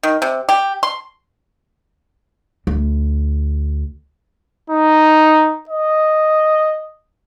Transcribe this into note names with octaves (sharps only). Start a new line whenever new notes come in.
D#3
C3
G4
C6
D2
D#4
D#5